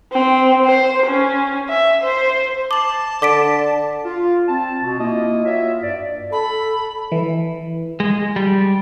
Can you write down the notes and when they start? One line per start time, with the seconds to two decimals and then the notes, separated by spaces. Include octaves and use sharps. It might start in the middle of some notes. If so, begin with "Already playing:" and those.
0.13 C4
0.65 C5
1.07 C#4
1.69 E5
2.03 C5
2.71 A5 D6 F#7
3.22 D3 D6 B6 D7
4.05 F4
4.48 C4 A5
4.83 B2
4.99 A#3 E4 F4 D#5
5.45 F4 F#4 C#5 E5
5.83 G2 D5
6.32 A4 B5
7.12 E3
8.00 G#3
8.36 G3